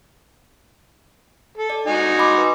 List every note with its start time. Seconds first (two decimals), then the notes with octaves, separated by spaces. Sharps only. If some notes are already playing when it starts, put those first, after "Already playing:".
1.58 A4
1.70 D5
1.87 D#4 F#4 G#5
2.19 B5 C6 D6
2.38 B4